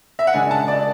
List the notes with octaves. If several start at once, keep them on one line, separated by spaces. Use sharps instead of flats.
E5
F#5
C#3 G#3 D4 G#5
A5
D5